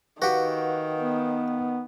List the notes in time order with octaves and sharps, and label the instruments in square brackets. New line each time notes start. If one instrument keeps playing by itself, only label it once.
[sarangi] D#3 [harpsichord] F#4 G4 [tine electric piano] B4 F5 F#5
[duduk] B3